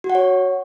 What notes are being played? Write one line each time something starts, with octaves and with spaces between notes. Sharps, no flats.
F#4
F#5
C#5